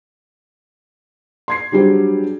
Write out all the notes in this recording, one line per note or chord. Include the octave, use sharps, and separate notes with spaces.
C6 G#6 C7
F#3 G3 D4 G4 G#4 C5